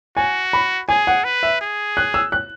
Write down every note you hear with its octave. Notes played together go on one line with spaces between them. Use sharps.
F#4 G#5
B5
G#4 G#5
F#5
B4
E5
G#4
F#6
E6
F#6